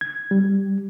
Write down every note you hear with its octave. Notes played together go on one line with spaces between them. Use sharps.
G#6
G3